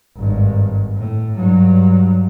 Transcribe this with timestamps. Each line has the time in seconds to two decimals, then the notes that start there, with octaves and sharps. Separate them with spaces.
0.17 G#1 G2
0.96 A2
1.36 G2 F#3